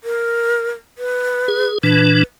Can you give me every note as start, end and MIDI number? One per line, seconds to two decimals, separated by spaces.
0.04 0.70 70
0.98 1.69 71
1.48 1.78 68
1.83 2.23 46
1.83 2.23 52
1.83 2.23 62
1.83 2.21 71